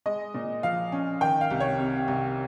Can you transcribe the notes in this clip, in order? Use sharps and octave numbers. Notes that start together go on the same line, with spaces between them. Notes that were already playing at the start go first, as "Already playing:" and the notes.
G#3 D#5
A#2
F3 F5
C#4
D#3 G5
F5
C2
C#5
C3
C2